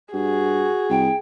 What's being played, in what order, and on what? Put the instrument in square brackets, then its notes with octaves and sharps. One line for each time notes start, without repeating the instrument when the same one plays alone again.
[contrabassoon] G2 [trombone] F#4 [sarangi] G#4
[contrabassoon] C2 [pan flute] G5